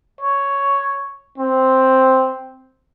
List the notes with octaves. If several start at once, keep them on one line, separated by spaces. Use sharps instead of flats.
C#5
C4